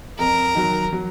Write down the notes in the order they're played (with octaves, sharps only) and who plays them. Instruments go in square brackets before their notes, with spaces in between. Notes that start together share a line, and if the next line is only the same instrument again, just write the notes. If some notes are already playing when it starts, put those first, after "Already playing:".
[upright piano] F2 [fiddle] A#4
[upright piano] D#3 F#3
F#3